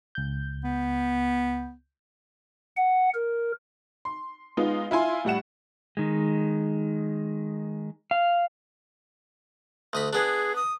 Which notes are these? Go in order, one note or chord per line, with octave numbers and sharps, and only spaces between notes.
C#2 G6
B3
F#5
A#4
C6
G#3 B3 D#4 F4
E4 F4 G#5 C6
A2 G3 F#5 E7
D#3 G#3
F5
D2 D#5 B5
B3 D4 G#4
D#6